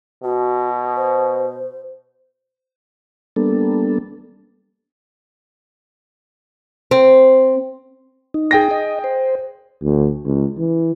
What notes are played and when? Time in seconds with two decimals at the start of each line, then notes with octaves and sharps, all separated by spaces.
0.24 B2 F#4
0.96 C5
3.36 G3 A#3 B3 D4 A4
6.91 C4
8.34 D#4
8.51 G#4 G5 A#6
8.71 D#5
9.04 C5
9.82 D2
10.25 C#2
10.59 E3